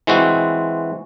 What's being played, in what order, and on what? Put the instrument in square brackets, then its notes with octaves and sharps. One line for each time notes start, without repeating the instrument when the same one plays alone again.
[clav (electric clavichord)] E3 G#3 C4 F#4